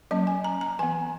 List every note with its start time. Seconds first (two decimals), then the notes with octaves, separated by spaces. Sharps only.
0.11 F#3 A#3 C#4 D#5
0.27 G#5
0.44 A#5
0.61 A#5
0.79 E3 B3 G#5